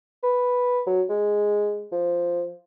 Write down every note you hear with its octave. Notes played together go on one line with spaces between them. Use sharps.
B4
F#3
G#3
F3